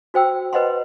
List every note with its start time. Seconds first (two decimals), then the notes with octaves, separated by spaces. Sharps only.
0.14 F#4 C5 G5 E6
0.53 B4 C5 D#5 F#5 B5 C6